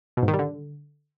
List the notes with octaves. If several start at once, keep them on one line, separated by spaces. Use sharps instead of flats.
B2
G#2
D#3
G3
D3